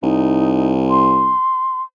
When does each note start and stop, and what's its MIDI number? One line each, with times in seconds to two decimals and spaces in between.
0.03 1.35 36
0.03 0.71 63
0.90 1.82 84